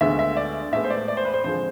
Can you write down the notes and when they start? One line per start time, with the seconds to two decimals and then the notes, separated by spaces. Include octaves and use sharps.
0.01 D2 D3 G#3 B3 E5
0.19 E5
0.37 D5
0.72 A2 G#3 B3 E5
0.84 C5
0.90 D5
1.08 D5
1.17 C5
1.25 B4
1.34 C5
1.44 F2 D3 F3 G#3 C5